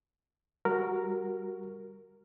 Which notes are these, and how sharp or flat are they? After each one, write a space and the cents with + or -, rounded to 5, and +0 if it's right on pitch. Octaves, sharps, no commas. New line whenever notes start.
G3 +0 F#4 +0 A#4 -5